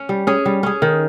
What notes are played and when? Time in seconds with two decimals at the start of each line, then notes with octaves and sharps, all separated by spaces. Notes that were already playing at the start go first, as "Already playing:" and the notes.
Already playing: C#4
0.09 G3
0.27 C#4 G#4
0.46 G3
0.63 C#4 G#4
0.82 D#3